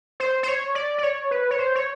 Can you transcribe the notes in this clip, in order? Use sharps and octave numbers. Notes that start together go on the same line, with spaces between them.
C5
C5
C#5
D5
D5
C#5
B4
C#5
C5
C#5